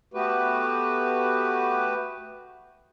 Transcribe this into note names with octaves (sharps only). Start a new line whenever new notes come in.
A3 B3 F#4 G4 B4